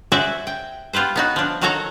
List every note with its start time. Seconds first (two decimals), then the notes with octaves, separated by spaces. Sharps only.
0.12 F#4 G#4 C5 D5 E5
0.47 G5
0.93 B3 F4 G4 B4 C5
1.16 B3 D#4 F#4
1.36 F3 D4
1.61 D#3 F#3 F#4 A4 C#5 A#5